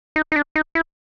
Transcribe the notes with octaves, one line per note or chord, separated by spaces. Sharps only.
D#4
D#4
D4
D#4
E4